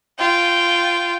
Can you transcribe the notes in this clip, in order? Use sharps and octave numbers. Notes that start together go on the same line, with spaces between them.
F4 G5